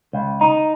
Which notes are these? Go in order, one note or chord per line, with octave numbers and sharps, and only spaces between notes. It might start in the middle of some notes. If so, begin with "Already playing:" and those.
C#2
D#4